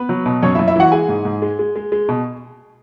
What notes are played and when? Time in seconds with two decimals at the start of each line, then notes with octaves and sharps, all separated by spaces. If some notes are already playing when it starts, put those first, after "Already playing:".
Already playing: B3 B4
0.09 F#3
0.26 B2
0.43 F#2 C#4 C#5
0.55 E4 E5
0.59 F#2
0.68 E4 E5
0.76 E3 F#4 F#5
0.92 G#3 G#4 G#5
1.09 G#2
1.25 G#2
1.42 G#3
1.59 G#3
1.76 G#3
1.92 G#3
2.09 B2